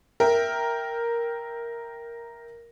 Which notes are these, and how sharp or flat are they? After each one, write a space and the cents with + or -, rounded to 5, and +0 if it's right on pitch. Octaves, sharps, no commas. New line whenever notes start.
A#4 +0 E5 +0 G5 +0